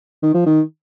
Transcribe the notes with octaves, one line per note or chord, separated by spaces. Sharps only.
D#3
F3
D#3